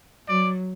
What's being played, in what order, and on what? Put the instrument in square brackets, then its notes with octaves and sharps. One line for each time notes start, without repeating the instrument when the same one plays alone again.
[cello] F#3 [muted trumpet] D5